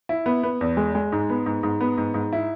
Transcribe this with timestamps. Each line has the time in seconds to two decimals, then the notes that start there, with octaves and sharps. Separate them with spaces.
0.09 E4
0.26 B3
0.43 B3
0.61 E2
0.77 G#3
0.95 G#3
1.12 G#2
1.30 B3
1.46 G#2
1.63 G#2
1.81 B3
1.98 G#2
2.14 G#2
2.33 E4